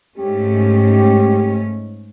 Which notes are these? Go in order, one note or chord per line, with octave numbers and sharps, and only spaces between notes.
G#2 A3 C#4 G4